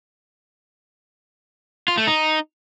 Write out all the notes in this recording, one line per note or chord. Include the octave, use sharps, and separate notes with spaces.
F4
A3
D#4